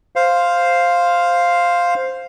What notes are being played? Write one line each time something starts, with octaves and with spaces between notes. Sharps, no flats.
C5 F5